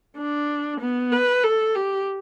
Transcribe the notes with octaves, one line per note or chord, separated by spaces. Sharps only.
D4
B3
B4
A4
G4